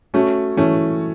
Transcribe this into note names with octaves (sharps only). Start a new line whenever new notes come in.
A3 C#4 F#4
E3 A3 C#4